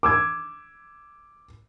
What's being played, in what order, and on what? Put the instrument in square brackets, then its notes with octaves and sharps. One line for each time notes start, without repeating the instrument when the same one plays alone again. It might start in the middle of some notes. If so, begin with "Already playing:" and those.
[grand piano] D6 E6 G#6